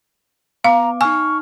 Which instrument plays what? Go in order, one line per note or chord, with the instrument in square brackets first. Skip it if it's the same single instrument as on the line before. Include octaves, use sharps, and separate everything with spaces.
[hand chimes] B3 D6 [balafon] F5 [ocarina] A#5
[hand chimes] D#4 F6 [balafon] G#5 [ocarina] C#6